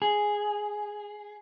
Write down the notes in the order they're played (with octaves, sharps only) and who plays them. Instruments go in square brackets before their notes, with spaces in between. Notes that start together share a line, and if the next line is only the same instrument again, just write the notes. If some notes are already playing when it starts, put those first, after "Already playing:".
[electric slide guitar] G#4